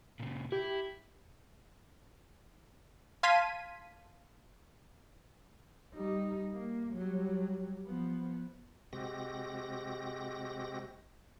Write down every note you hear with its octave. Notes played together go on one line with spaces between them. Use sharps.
A#2 C#3
E4 G4
F5 A5 C6 G#6 B6 D#7
G3 D#4
A#3
F#3 G3
F3 B3
C3 G#3 C4 F#4 G4 A#6